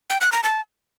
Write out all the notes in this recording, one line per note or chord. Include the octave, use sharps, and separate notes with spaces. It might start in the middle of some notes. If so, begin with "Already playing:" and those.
G5
F#6
A#5
A5